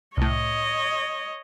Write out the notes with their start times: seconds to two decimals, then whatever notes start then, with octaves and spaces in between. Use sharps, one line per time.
0.17 C2 A2 C#5 D#5